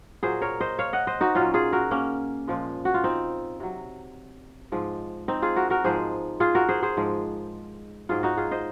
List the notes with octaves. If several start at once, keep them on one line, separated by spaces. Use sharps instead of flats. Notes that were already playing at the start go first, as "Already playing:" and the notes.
A#2 F#3 G#4 C5
A#4 C#5
C5 D#5
C#5 F5
D#5 F#5
C5 D#5
D#4 F#4
A#2 F#3 C#4 F4
F4 G#4
F#4 A#4
A#3 C#4
A#2 F3 G#3
F#4
F4
C4 D#4
C3 F#3
G#2 F3 G#3
C4 D#4
F4 G#4
F#4 A#4
F#4 A#4
G#2 F3 G#3 G#4 C5
F4 G#4
F#4 A#4
G#4 C5
G#4 C5
G#2 F3 G#3
G#2 F#3 F4 G#4
D#4 F#4
F4 G#4
C5 D#5